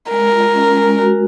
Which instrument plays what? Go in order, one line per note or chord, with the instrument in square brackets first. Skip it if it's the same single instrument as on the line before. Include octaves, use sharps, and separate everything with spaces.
[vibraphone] G#3 [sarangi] A#4
[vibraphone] F4
C#4
G#3
F#4